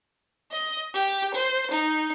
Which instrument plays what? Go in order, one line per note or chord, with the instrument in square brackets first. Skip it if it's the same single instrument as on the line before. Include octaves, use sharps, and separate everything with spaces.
[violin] D#5
G4
C5
D#4